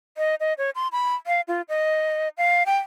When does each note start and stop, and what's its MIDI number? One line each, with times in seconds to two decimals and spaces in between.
0.18 0.35 75
0.40 0.54 75
0.58 0.70 73
0.75 0.88 84
0.92 1.15 83
1.27 1.41 77
1.48 1.62 65
1.69 2.29 75
2.38 2.63 77
2.66 2.78 79